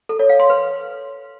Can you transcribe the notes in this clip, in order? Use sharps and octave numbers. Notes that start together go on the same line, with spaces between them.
A4
C#5
F5
C6
B4